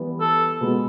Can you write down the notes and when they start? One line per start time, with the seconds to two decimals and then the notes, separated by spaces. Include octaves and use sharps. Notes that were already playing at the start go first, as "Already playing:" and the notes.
Already playing: E3 G3 B3
0.21 A4
0.61 B2 G#3 B3